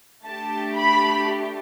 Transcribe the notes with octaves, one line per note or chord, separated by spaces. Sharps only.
A3 D4 G4 A5
B5